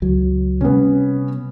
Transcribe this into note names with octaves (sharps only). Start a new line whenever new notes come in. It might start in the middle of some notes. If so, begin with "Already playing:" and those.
C#2 F#3
C3 G3 B3 C#4